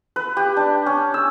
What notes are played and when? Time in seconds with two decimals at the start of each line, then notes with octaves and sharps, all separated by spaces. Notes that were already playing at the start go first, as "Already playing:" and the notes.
0.16 B4
0.37 G4
0.57 D4
0.86 C#4
1.14 E6